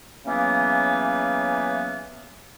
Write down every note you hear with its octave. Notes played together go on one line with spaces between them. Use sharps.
C#3 E3 F#3 A#3 B3 C#4